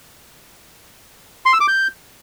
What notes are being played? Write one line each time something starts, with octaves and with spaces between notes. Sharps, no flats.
C6
E6
D6
G6